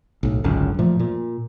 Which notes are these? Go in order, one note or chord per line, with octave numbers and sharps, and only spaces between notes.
B1 A2
G#1 C#2 F#2 D3
A#2 F3 A3
A#2